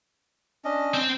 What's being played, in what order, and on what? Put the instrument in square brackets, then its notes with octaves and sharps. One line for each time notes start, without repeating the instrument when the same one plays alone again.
[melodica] C#4 D4 D#5
[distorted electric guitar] C4 C5